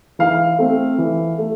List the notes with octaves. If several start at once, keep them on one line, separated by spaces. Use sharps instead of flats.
E3 F5
A3 C4
E3
A3